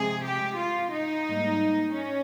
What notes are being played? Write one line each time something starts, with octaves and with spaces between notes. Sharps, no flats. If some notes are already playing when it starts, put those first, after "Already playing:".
Already playing: C3 F3 G#3 C4 G#4
G4
F4
D#4
G#2 G3 A#3
C#4